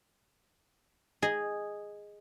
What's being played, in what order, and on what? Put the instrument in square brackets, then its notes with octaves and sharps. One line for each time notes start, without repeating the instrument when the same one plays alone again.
[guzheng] G#4 D#5